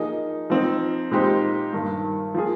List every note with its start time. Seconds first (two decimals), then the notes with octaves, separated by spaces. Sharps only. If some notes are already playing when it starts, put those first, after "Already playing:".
Already playing: F3 A#3 D#4 G#4 D#5
0.50 F3 C4 D#4
1.11 A#2 G#3 D#4 G4 C5
1.73 G2 D#3 A#3
2.34 F3 A#3 F4 G#4